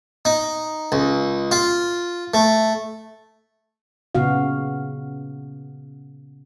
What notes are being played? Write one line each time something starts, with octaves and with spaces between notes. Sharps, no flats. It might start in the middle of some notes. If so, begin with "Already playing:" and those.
D#4
C#2
F4
A3
A#2 C#3 B3 F#4 F5